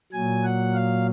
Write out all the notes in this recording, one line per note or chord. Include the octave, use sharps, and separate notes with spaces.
A#2 F#3 G#5
F#5
F5